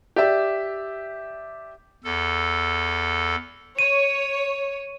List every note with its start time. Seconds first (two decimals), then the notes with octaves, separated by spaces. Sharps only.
0.16 G4 D5 E5
2.04 E2 A4
3.79 C#5 D#7